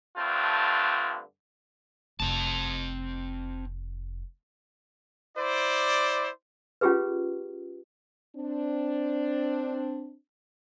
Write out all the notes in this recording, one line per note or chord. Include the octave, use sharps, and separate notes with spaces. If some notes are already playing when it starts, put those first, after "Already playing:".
G2 D3 A3 C4 F4
F1 C4 A5
E4 C5 D5
C#4 F4 G4 G#4 B4
C4 D4